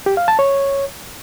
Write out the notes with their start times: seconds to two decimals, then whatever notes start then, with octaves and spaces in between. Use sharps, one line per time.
0.06 G4
0.17 F5
0.28 A5
0.39 C#5